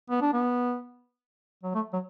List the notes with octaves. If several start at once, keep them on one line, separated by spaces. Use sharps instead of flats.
B3
D4
B3
F#3
A3
F#3